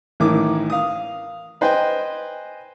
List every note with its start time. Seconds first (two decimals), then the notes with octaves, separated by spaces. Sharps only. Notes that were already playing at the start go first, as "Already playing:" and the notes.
0.20 A1 A2 D#3 D6
0.70 F5 D#6
1.61 B4 C5 D#5 G5 G#5